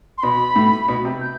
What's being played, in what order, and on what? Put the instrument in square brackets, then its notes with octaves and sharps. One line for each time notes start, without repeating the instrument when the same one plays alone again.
[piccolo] C6
[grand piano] B2 [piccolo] B5
[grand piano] A2
B2
C3
[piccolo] G6